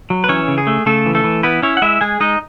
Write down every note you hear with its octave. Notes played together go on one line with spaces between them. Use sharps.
F#3
B4
E3 C#4 C#5
C#3
G#4
A3
C#3 A3 A4
E3
A3 A4
E3
B3 E4 B4
C#4 E4 C#5
F#5
G#3 E4 E5
G#3 G#4 G#5
G#3 D#4 D#5